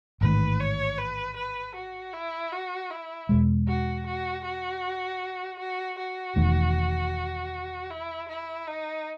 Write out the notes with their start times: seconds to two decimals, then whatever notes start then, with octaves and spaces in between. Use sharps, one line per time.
0.21 A1 G#2 D#3 A3 B4
0.60 C#5
0.98 B4
1.36 B4
1.75 F#4
2.13 E4
2.52 F#4
2.91 E4
3.29 E2 B2 G#3
3.68 F#4
4.06 F#4
4.44 F#4
5.59 F#4
5.99 F#4
6.36 E1 E2 D#3 A3
7.90 E4
8.29 E4
8.67 D#4